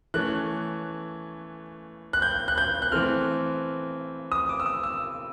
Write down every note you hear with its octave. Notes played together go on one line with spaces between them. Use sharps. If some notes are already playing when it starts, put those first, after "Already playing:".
E3 A3 C#4 F#6
F#6
G6
F#6
G6
F#6
E3 A3 C4 F6
D#6
D6
E6
D#6
E6